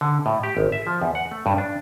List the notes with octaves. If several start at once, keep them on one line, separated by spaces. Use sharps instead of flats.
D3
A2
G4
G#1
E5
F3
E2
F#5
A3
G2
D4